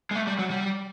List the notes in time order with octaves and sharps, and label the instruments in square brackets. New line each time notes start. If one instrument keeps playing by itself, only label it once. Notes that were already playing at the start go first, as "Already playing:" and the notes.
[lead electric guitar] G#3
A3
G3
F#3
G3